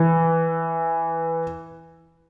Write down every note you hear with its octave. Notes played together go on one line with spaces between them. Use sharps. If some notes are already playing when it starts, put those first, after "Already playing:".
Already playing: E3